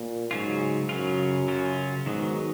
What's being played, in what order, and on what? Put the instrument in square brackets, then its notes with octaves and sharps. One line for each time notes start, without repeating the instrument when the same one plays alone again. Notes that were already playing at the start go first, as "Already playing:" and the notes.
Already playing: [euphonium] A#2
[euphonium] G#2 [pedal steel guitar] C#3 F#3 C#4 F4
[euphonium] F#2 [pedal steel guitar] C#3 F#3 C#4 F4
[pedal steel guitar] C#3 F#3 C#4 F4
[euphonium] G#2 [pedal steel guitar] D#3 F#3 B3